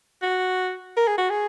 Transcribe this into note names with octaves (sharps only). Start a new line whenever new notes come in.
F#4
A#4
G#4
F#4
G#4